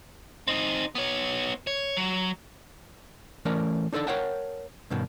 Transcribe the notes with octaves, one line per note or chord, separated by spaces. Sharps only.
C4 D#4
B3 C#5
C#5
F#3
E3 A3 C#4 A#4 D5
D4 D#4 A4 C5 D5
A#4 C5 C#5 F#5 G5 A5
G2 B2 D#3